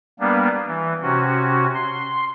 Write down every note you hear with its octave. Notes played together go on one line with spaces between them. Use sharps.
G3 A#3 B3 D4
E3
C3 C#4 F#4
C6